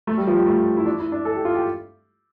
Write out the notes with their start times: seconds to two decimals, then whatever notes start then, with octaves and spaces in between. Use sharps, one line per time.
0.07 A3
0.17 G3
0.27 F3
0.37 G3
0.47 A3
0.77 E4
0.86 D4
0.99 E4
1.12 D4
1.25 A4
1.35 G4
1.45 F4
1.55 G4